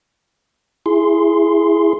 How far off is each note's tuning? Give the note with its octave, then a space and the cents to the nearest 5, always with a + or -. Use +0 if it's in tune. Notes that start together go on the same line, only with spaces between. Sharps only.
E4 +10 G#4 +0 C6 +0